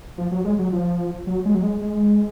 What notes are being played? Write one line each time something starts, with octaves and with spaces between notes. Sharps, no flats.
F3
F#3
G#3
F#3
F3
F#3
G#3
F#3
G#3
G#3